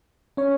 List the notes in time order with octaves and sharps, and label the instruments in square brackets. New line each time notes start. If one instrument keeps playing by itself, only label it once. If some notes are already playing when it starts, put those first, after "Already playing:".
[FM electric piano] C#4 C#5